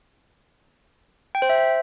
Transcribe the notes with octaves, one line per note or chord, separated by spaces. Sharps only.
G5
C5
E5